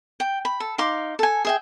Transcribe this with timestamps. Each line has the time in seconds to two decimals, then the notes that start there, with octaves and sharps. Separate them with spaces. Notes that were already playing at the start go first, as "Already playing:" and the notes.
0.20 G5
0.45 B5
0.60 A4
0.78 D#4 F5 C6 D6
1.19 A4 G#5
1.45 G#4 E5 G5